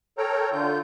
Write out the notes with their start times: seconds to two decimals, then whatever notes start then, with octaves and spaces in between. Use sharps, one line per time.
0.18 A4 A#4 C#5 G5 A#5
0.52 D3 F4 G6